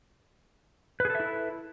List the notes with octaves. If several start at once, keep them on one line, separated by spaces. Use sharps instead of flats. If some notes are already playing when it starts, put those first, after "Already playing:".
E4 G#4 A4 B4 E5